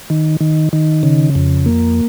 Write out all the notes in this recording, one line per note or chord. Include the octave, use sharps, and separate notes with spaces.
D#3
D#3
D#3
C#3
F2
A#3